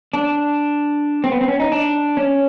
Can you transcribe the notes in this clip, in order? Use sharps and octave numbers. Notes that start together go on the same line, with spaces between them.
D4
C4
B3
C4
C#4
D#4
D4
C#4